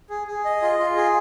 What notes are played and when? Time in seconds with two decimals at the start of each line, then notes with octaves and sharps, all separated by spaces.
0.10 G#4
0.27 G#4
0.45 D#5
0.62 F4
0.79 F4
0.96 G#4